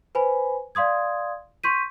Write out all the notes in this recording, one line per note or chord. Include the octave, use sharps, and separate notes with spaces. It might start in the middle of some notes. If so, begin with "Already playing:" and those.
B4 C5 G#5 B5
D5 F5 C6 D#6 G#6
C6 C#6 G6 B6 D#7